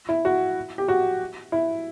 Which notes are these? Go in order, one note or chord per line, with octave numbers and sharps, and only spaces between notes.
E4
F#4
G4
F#4
E4